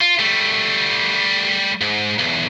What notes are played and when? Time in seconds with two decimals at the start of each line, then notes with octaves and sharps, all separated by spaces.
0.01 F4
0.19 G3 A3
1.81 G#2
2.18 B1 E2